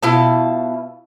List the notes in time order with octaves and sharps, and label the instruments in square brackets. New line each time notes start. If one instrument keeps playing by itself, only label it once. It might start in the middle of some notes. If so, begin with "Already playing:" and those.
[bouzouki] B2 E4 F4 A5